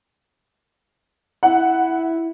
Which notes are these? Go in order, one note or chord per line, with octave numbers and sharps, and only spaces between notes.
E4 F#5